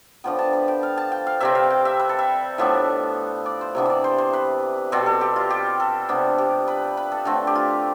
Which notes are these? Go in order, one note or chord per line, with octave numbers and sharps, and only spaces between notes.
D3 F3 B3 G5
A5
B5
G5
F5
A5
G5
F5
C3 G3 C4 E5
F5
G5
E5
B4
A4
E5
A2 F3 B3 D4 E5
D5
C5
C3 E3 B3 D4 E5
D5 E5
C5
C5
B4
B2 G3 C4 A4
A4
G4
F4
G4
A4
C3 G3 B3 D4
G4
B4
B4
A4
D3 A3 C4
G4
F4